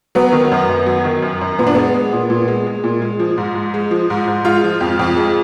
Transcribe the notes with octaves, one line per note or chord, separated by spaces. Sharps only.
F#3 B3
D#3
F#2
F#2
F#3
D#3
F#2
F#2
A#2 B3
D4
G#3 B3
G#3
A#2
A#2
G#3
G#3
A#2
G#3
F3
G#2
G#2
G#3
F3
G#2
G#2
G#3 F4
F3
F2
F2
G#3